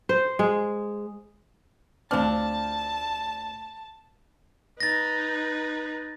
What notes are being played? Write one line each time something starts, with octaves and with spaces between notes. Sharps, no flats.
C5
G#3
D2 F3 C4 D4 A5 F6
D#4 B4 A6 A#6